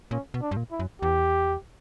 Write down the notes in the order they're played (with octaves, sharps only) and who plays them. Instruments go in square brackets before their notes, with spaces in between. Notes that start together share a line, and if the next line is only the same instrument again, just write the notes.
[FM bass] A#2 [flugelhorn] C#4
[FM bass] B2
[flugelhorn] D4
[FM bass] G2
A#2
[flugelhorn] E4
[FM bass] F#2
[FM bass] E2 [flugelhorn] G4